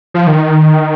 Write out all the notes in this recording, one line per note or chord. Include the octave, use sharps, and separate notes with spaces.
F3
D#3